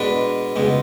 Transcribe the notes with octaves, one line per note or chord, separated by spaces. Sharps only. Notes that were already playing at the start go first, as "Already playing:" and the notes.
Already playing: B2 G#3 D4 B4
C#2 B2 G#3